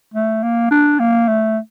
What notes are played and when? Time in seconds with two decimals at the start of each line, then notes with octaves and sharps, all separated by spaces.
0.14 A3
0.43 A#3
0.71 D4
0.99 A#3
1.28 A3